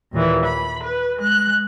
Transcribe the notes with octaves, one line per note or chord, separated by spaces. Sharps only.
D#2 A#2 E3
B5
B4
G#3 F#6